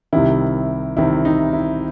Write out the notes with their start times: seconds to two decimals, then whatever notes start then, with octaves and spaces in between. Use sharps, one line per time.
0.13 C2 C3 D#3 E4
0.96 C2 C3 D#3 E4
1.25 D#4
1.53 E4